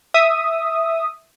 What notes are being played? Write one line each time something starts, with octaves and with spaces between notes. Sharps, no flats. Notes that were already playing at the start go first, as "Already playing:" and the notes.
E5 D#6